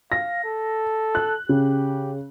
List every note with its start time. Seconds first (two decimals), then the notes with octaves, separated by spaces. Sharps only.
0.12 F5 A#6
0.44 A4
1.15 F#6
1.49 C#3 G4